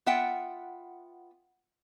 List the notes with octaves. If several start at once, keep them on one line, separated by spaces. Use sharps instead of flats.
B3 F4 E5 F#5 G5